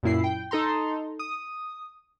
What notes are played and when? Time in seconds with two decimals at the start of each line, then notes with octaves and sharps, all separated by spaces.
0.03 F#2 A#2 E4 C7
0.24 G5
0.51 D#4 A4 A#5 C6
1.19 D#6